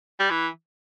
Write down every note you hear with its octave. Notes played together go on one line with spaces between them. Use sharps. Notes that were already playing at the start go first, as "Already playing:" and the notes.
G3
E3